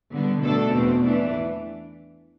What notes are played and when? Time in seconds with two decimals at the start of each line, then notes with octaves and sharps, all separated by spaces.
0.13 D3 G3 B3
0.43 B2 A3 D4 A4
0.73 E2 B2 A3 C4
1.04 E3 A3 D4